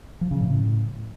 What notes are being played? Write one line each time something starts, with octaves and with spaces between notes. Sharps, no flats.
F3
C#3
A2